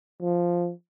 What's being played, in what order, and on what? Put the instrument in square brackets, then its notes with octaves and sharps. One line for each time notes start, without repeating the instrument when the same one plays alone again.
[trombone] F3